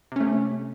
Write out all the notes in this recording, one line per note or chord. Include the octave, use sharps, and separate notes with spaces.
C3 A3 C#4